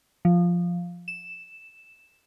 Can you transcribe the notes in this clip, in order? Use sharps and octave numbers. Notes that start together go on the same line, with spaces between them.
F3
E7